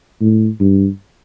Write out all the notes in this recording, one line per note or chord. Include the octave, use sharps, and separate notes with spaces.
A2
G2